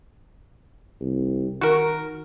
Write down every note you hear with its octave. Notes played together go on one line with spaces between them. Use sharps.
C2
D#3 F#4 A#4